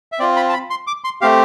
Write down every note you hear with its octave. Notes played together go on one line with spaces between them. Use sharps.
E5
C4 F4 D5
B5
A5
B5
C6
D6
C6
A3 C4 G4 F5